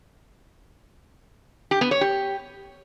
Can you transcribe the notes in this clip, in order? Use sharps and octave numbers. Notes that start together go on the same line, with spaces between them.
G4
B3
C#5
G4